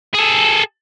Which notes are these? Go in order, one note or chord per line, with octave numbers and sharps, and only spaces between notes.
G#4 A4